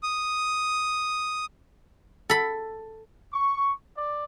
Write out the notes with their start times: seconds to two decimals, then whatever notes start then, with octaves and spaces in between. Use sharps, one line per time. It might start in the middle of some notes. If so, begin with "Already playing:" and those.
0.03 D#6
2.30 A4 B5
3.32 C#6
3.96 D5